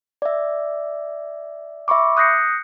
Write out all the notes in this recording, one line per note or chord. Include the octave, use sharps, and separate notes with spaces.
D5 E5
E5 B5 C#6 D6
D#6 F#6 G6 A#6 C7 C#7